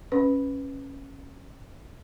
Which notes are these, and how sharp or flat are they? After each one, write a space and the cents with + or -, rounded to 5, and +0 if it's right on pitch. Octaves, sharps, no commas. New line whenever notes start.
C#4 -15 B4 +0